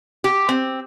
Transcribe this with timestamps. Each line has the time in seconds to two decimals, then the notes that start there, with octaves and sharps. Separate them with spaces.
0.24 G4
0.49 C4